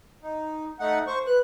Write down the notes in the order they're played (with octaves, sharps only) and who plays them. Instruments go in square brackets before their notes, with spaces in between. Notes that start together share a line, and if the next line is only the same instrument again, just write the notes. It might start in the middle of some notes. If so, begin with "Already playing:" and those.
[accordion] D#4
A3 D#4 F#5
C5 C#6
[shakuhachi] B4 [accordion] F#6